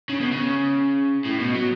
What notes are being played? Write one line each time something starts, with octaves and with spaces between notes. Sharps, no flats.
C#3
B2
C#3
A2
B2
F#3